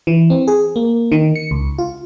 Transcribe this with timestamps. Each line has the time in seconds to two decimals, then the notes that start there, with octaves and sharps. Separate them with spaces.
0.07 E3
0.30 C4
0.48 G#4
0.76 A#3
1.12 D#3
1.36 C#7
1.51 C#2
1.78 F4